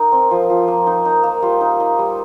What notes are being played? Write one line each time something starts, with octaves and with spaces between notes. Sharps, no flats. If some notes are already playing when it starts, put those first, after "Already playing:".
Already playing: D#4 A#4
C4
F3
F3
A#3
D#4
D#4
A#3
G3 F4
D#4
D#4
G3